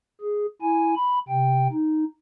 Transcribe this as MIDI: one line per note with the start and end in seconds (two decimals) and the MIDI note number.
0.21 0.46 68
0.62 0.94 64
0.62 0.94 80
0.96 1.19 83
1.28 1.67 48
1.28 1.67 79
1.72 2.05 63